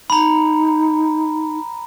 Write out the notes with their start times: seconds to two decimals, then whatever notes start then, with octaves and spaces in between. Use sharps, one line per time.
0.10 D#4 A#5 B5